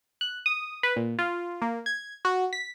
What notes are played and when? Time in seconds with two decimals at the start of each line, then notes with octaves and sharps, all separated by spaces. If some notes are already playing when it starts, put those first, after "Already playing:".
0.21 F#6
0.46 D#6
0.83 B4
0.96 A#2
1.19 F4
1.62 A#3
1.86 G#6
2.25 F#4
2.53 B6